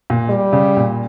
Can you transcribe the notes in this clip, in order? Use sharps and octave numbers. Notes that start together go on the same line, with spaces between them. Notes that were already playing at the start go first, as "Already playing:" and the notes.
A#2
G3
C#3
A#2